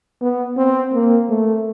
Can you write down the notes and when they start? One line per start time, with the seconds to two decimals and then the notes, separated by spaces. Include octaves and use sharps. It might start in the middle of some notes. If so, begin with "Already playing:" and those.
0.21 B3
0.57 C4
0.93 A#3
1.29 A3